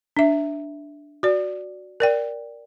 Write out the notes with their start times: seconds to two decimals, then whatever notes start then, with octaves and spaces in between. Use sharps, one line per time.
0.17 D4 E5
1.23 F#4 D5
2.00 A#4 D5 G5